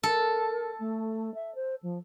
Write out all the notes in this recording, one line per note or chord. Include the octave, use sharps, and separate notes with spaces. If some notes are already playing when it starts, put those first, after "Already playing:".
A4 A#4
A3
E5
C5
F3